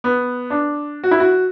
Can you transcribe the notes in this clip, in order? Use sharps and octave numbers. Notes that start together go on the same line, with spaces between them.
B3
D4
F#4
E4
F#4